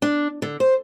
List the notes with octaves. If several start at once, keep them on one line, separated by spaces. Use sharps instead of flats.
D4
D3
C5